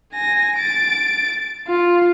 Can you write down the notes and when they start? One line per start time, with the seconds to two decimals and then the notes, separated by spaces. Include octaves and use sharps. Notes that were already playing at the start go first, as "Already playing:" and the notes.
0.13 G#5 A#6
0.57 A6 D7
1.68 F4